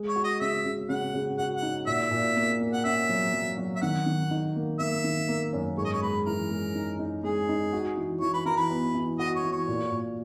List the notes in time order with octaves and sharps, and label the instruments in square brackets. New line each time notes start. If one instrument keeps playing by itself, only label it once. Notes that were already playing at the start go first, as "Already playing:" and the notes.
Already playing: [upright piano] G#3
[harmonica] C#5
[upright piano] F#4
[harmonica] D#5
[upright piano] C#3 [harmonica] E5
[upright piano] C#3
[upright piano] C#3 [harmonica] F#5
[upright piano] C#3
[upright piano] F#4 [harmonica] F#5
[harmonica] F#5
[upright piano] D#4
[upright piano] A#2 [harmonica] E5
[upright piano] A#2
A#3
A#3
[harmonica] F#5
[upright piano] C#4 [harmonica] E5
[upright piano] F#3
F#3
F#3
[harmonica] E5
[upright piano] D#3 [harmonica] F#5
[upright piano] D#3
D#4
A#3
[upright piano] A#3 [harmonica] E5
[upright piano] D#3
A#3
F#2
[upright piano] G#2 [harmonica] C#5
[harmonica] D#5
C#5
[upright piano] G#3 [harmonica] B4
[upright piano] E3 [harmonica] A#4
[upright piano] G#3
D#4
D#4
[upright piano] G#3 [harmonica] G#4
[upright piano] D#4
F#4
E3
[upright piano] E3 [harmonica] C#5
[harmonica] B4
[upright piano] E3 [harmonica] A#4
[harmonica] B4
[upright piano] B3
E3
[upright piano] F#4 [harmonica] D#5
[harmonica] C#5
[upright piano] E3
[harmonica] C#5
[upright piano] A#2
A#2